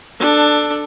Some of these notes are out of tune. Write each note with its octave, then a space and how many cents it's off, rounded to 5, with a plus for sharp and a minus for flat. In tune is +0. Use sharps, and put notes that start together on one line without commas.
D4 +15 A4 +0